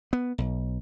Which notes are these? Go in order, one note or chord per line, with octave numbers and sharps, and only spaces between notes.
B3
B1